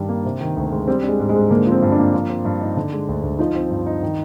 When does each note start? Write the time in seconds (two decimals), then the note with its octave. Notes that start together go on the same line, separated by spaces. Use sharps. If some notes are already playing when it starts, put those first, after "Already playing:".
Already playing: G2 D#3 G3 D4
0.09 A#3
0.25 C3
0.41 D#3
0.57 D2
0.72 G#3
0.88 G3 C4
1.03 G#3 D4
1.20 G#2
1.29 G#3
1.35 G#2
1.50 D3 A#3
1.66 F3
1.71 C4
1.82 G2
1.92 D4
1.98 A#3
2.14 F3
2.29 C4
2.45 G2
2.61 D#4
2.77 D3
2.93 G#3
3.09 D2
3.23 D2
3.39 F3 D#4
3.55 C4
3.70 G2
3.86 D#4
4.03 D#3